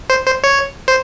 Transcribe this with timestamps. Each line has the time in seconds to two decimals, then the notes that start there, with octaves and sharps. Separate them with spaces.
0.10 C5
0.26 C5
0.44 C#5
0.88 C5